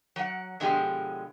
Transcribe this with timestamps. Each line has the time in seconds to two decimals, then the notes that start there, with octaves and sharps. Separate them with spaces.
0.16 F#3 F#5
0.60 B2 D3 F3 G#3 G4